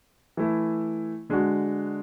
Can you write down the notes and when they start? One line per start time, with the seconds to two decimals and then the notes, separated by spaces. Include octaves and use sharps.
0.37 E3 A3 E4
1.30 D3 G#3 D4 F#4